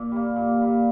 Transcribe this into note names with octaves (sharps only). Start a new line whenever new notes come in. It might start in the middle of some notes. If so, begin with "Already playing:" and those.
Already playing: A#2
G3 A#3
A#2
G3 A#3